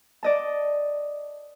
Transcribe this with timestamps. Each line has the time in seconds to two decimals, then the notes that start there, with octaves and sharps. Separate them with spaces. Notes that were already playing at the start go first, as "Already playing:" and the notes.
0.23 D5 D#5 A5